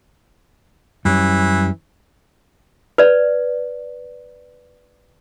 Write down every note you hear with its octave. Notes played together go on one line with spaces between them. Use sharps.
F#2 E3 G3 C#4
B4 D5